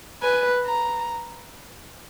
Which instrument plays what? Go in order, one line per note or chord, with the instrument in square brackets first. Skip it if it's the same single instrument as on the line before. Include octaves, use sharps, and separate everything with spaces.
[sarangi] B4 [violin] G#5
[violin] A#5